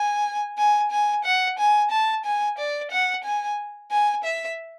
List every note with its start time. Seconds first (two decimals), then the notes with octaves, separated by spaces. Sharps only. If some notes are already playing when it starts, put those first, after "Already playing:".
Already playing: G#5
0.58 G#5
0.91 G#5
1.24 F#5
1.58 G#5
1.90 A5
2.25 G#5
2.58 D5
2.91 F#5
3.24 G#5
3.91 G#5
4.24 E5